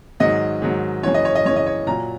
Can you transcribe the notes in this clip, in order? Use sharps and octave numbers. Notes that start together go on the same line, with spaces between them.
G#2 D#3 F#3 D#5
G#2 D#3 F#3
F#2 C#3 E3 C#5
D#5
C#5
D#5
F#2 C#3 E3 C#5
D#5
C#5
A#2 F#3 A#5